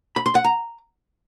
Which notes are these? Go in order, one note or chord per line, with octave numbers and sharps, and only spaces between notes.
B5
C6
F#5
A#5